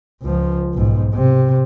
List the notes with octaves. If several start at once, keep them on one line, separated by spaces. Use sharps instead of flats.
C#2 F3
B1 G#2
C3